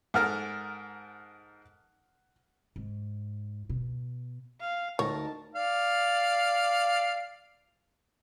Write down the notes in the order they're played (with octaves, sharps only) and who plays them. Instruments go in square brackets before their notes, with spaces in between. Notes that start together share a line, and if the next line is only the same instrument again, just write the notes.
[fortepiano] G#2 A4 A#4 [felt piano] F#5 F6
[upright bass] G#2
B2
[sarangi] F5
[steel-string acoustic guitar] D2 A#4 [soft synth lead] D#4 [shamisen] C#5 [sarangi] A5
[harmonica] D5 F5